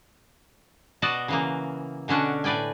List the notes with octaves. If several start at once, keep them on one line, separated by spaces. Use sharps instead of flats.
B2 F#4 D5 D#5 A5
C#3 E3 A#3
B2 D3 C#4 D4 F#4
A2 B4 D5 G5 G#5